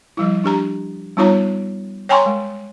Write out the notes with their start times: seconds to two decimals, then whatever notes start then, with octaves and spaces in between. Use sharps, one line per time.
0.17 F3 G3 E4
0.44 D4 G4 A#5
1.17 G3 B3 D#4 F4 C#5 A#5
2.09 C#5 G5 G#5 A#5 C6 C#6
2.26 G#3